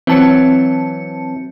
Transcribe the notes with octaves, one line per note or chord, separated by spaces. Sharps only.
E3 F#3 C4 A5 C#7